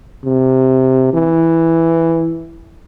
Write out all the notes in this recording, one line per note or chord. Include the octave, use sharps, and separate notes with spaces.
C3
E3